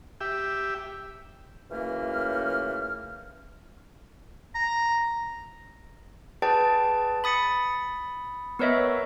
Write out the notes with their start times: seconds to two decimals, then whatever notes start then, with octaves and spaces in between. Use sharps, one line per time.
0.21 G4 E5
1.71 C#2 F#2 E3 A3 A#3 F6
4.55 A#5
6.42 G#4 B4 D5 G5 A5
7.24 B5 D#6 A6 C#7
8.59 B3 A#4 B4 C#5 D#5 E5